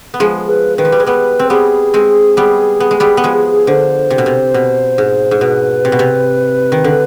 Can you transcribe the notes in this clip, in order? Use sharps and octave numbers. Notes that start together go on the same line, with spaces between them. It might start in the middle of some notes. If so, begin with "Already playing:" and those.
B3
F3 G#3 G#4
B4
D#3 B4
F3
G3
G#3
G3 B3 B4
C4
G3 B3 G#4
G#3 C4
G3 B3
B3
G#3
G3 B3
B3
F3 G#3
D3 C5
C3
B2
C3
B2
G#2
G#2
B2 B4
C3
B2
C3
D#3
D3